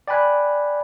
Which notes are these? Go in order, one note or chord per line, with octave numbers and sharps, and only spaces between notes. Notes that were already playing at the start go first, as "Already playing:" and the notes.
D5 G5 G#5 B5 F#6